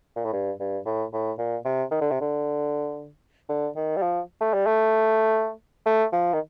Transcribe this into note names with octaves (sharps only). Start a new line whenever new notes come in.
A#2
A2
G2
G2
A2
A2
A#2
C3
D#3
D3
C3
D3
D3
D#3
G3
F3
A3
G3
A3
A3
F3
D#3